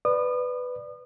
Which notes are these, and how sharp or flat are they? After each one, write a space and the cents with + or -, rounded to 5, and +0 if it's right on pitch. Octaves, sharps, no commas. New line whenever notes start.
B4 +10 D5 +5 D#6 -35